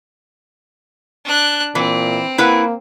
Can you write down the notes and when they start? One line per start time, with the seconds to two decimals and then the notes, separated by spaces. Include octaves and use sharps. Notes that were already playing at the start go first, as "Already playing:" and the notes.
1.25 D4 F#6
1.75 A#2 E3 C4
2.38 A#3 E4 B4 F#5